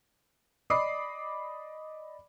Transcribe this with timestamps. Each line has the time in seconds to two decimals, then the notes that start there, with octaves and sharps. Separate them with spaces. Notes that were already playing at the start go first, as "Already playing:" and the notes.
0.70 D5 D#5 B5 D6 D#6 C7